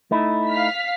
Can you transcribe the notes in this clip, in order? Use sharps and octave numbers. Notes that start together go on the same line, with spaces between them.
A3 D#4 E4
F5 F6 B6